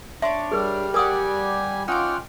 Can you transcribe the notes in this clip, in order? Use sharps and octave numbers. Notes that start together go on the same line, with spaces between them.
D4 C#5 E5 C6
G3 G#4 A#4 F6
G4 A#4 D5 F#5 G#5 D#6
C#4 D#4 F4 F#5 G5 D6 F6